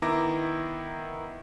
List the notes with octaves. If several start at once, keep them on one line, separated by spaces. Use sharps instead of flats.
D#3 B3 E4 A#5 D6 A#6